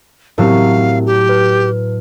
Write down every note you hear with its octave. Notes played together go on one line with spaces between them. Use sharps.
A2 F#3 C4 G4 A#4 F5
G4
B4